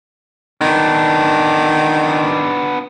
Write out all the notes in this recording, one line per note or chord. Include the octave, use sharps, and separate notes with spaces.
D#3 B3 D4